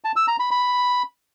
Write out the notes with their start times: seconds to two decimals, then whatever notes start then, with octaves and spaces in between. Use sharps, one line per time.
0.04 A5
0.16 E6
0.28 A#5
0.39 B5
0.51 B5